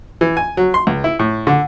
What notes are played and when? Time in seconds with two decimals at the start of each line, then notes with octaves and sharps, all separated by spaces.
0.21 E3
0.37 G#5
0.57 F#3
0.74 C6
0.87 C#2
1.04 E4
1.19 A2
1.47 D3